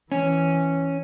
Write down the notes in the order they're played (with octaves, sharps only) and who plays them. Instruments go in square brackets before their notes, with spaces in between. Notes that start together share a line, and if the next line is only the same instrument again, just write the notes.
[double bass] E3 [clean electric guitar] C#4